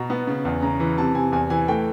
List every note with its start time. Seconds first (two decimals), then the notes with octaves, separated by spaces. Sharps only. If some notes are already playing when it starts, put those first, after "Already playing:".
Already playing: B2 A#5
0.10 B3
0.27 C#3
0.45 E2
0.62 C#3 A#5
0.80 E3
0.98 C3 A5
1.15 C3 G#5
1.32 E2 G#5
1.50 E3 G#5
1.68 A3 G5